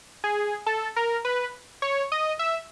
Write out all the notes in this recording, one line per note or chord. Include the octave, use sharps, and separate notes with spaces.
G#4
A4
A#4
B4
C#5
D#5
E5